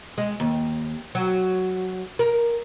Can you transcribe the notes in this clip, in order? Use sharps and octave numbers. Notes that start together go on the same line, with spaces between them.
G#3
D#2
F#3
A#4